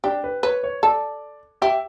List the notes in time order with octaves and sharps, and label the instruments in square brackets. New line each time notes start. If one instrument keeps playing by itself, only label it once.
[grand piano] D4 [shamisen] G4
[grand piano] B4
[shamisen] B4 [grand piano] C#5
[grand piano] C#5
[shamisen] A4 [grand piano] D5
[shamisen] G4 [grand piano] E5